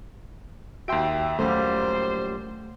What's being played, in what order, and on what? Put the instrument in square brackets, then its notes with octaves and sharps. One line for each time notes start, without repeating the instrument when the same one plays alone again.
[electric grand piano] D#2 C6 D7 [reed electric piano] F#4 G5 [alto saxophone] E5
[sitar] F#2 A#2 G3 [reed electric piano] A3 [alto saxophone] C5